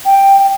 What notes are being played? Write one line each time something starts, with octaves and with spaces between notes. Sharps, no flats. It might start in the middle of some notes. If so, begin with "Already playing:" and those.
G5